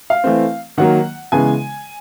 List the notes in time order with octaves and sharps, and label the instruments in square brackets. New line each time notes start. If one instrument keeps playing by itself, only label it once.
[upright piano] F5
E3 A3 C4
D#3 F#3 A#3 F#5
C#3 E3 G#3 B3 G#5